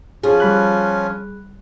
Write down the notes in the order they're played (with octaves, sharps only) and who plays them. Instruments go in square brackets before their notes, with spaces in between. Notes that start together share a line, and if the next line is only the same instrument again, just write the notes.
[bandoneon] F3 C#4 F4 [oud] G#4
[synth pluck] G3 B5 F#6